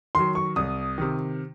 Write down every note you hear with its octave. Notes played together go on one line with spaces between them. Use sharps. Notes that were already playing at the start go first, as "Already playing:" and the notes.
D#3 F#3 C6
C#6
C2 D#6
C3 D#3